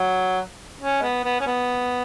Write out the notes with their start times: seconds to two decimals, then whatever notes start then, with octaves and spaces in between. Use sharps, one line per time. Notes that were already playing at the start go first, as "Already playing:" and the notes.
Already playing: F#3
0.81 C#4
1.00 G#3
1.03 B3
1.25 B3
1.41 C#4
1.47 B3